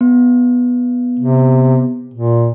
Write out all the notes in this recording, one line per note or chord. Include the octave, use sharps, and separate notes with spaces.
B3
C3
A#2